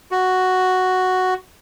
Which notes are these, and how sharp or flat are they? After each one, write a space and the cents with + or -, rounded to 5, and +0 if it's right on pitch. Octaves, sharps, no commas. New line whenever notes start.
F#4 +0